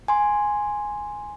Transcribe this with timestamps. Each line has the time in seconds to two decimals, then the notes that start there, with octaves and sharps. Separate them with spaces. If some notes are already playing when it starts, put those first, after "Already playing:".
0.08 G#5 C6